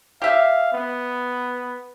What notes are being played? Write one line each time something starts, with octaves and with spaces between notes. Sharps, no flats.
G4 E5 F5
B3